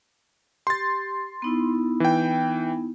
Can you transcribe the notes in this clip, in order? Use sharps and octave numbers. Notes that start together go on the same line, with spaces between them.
G4 C6 A6
B3 D#4 E4
E3 G5